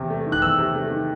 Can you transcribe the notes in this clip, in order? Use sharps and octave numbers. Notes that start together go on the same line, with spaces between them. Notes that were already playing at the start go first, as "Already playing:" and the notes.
Already playing: E2 C3
A3
D#3
F#6
E2 E6
C3
A3
D#3